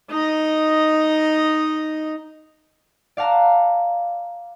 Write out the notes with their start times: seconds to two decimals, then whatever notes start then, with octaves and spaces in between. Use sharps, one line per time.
0.10 D#4 D#5
3.17 D5 F5 F#5 A5 A#5